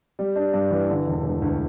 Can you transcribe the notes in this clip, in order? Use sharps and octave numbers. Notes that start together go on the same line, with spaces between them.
G3
D4
G2
E3
D3
E1
E1
D2